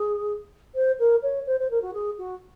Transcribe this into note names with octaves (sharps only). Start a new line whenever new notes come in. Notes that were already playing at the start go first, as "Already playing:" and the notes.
Already playing: G#4
C5
A#4
C#5
C5
C5
A#4
F#4
G#4
F#4